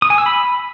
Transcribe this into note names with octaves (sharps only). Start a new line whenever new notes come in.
D#6
G#5
E6
B5